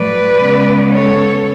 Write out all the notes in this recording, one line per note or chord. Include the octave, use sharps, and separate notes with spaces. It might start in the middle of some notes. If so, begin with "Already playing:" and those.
Already playing: A2 F#3 A3 B4 D5
C#3 G#3 B3
A4 C#5